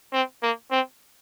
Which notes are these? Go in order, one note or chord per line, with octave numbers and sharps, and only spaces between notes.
C4
A#3
C4